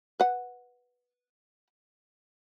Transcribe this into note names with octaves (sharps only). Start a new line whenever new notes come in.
B4 F#5